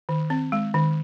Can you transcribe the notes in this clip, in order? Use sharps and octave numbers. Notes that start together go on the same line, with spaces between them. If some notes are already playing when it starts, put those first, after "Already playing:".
D#3
C4
G#3
D#3